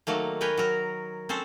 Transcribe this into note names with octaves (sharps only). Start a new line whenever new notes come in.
D#3 F#3 A3 A#3
A#4 B4 C#5 G5 G#5
F#3 A#4
C4 C#4 A4 C5